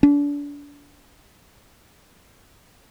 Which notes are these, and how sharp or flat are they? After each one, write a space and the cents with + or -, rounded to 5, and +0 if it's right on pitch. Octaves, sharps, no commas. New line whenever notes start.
D4 -30